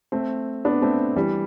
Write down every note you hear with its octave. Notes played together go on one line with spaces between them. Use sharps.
A3 C4
B3 D4
A3 C4
E3 G3